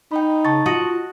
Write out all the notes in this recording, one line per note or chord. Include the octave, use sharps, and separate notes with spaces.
D#4 G5 B5
C#3 A5 C#6 A6
F4 F#4 D#5 F#5